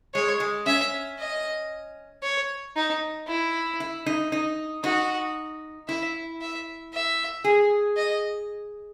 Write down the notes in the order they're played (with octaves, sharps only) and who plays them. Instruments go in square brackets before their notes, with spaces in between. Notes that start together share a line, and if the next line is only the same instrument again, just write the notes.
[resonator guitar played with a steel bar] G#3 [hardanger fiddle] C#5
[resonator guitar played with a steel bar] G#3
[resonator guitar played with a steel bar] C#4 [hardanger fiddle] E5
[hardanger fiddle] D#5
C#5
D#4
E4
[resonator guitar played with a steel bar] E4
D#4
D#4
[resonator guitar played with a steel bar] D#4 [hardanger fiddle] F#4
[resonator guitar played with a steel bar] E4 [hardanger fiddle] E5
[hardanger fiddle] E5
E5
[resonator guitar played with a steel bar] G#4
[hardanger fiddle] D#5